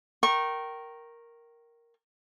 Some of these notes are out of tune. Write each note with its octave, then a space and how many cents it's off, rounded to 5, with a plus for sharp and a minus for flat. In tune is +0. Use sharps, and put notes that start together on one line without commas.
A#4 +0 G5 -25 C#6 -25